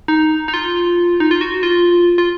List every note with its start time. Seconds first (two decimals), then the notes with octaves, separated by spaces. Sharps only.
0.08 D#4
0.48 D#4
0.54 F4
1.20 D#4
1.31 F4
1.41 F#4
1.63 F4
2.18 F4